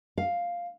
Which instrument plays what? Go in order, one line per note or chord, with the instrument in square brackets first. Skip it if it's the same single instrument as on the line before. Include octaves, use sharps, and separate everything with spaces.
[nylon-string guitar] F5